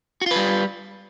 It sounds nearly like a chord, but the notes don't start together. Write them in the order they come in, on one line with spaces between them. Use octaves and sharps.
F#4 F4 B4 G3